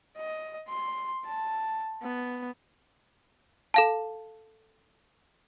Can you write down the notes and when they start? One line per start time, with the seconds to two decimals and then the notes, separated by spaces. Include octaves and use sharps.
0.17 D#5
0.68 C6
1.25 A5
2.03 B3
3.74 A4 F5 A5